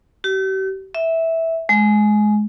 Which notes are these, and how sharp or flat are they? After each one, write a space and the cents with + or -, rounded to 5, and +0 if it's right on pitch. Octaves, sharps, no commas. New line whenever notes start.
G4 -40
E5 -10
G#3 +20